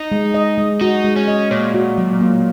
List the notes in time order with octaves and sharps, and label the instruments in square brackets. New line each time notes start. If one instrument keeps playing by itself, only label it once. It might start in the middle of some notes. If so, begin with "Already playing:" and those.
Already playing: [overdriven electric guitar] D#4
[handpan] G#3
D#5
G#3
[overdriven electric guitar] D#4 [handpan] F#4
[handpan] G#3
[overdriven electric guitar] C#4
[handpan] D#5
[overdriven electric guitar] A#2 [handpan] C#5
[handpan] F#4
F#3
A#3